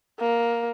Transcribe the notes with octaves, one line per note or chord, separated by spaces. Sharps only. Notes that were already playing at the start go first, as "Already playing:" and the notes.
A#3